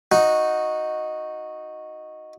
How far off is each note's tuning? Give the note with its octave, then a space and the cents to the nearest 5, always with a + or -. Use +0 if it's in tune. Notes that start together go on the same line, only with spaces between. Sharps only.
D#4 +0 F#4 -10